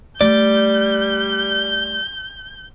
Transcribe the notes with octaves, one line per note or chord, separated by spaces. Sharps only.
G3 A3 D5 G6